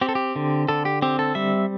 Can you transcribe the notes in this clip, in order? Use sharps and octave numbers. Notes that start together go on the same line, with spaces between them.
C4 G4
A4
G4
D3
D3 A4
G4
C4 G4
A4
G3 E5